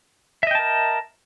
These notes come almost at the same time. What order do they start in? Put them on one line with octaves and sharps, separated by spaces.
E5 D#5 G5 A5 A#4